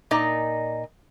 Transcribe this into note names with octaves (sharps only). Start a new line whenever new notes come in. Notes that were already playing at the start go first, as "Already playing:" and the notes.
A#2 D#4 D5 D#5 A#5